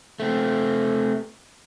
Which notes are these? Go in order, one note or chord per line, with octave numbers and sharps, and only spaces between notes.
A3 C4